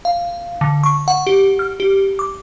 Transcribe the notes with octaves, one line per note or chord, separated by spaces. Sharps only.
F5
D3
C#6
F#5
G4
F6
G4
D6